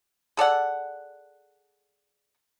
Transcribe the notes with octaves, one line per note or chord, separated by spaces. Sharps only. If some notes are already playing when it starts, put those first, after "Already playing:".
G#4 A4 D5 F#5